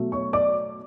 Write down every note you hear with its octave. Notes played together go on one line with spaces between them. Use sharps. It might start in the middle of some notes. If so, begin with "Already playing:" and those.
Already playing: B2 F#3 A3
C#5 C#6
D5 D6